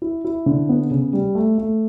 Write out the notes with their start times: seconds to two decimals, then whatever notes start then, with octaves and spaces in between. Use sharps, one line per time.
0.02 E4
0.25 E4
0.46 D3
0.69 B3
0.91 C#3
1.13 G3
1.35 A3
1.58 A3